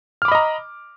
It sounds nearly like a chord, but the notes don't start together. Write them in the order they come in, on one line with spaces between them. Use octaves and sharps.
F6 D6 B5 D#5 A#5